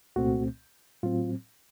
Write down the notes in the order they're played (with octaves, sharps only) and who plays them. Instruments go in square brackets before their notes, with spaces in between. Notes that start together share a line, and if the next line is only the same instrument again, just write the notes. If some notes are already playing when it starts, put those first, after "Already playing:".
[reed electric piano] C2 A#2 A3 C4 F#4
A2 F#3 C4 F4